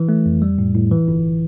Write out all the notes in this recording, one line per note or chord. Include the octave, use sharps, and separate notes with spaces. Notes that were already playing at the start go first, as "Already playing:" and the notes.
Already playing: E3
A3
F2
G3
A2
A2
E3
G1